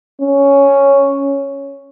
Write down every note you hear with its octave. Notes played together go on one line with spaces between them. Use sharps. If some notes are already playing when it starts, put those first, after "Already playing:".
C#4